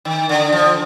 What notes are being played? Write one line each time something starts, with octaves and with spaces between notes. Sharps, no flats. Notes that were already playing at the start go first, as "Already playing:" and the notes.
D#3
D3
F3